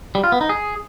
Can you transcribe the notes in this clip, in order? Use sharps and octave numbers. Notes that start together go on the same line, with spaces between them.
G3
F4
B3
D#4
G#4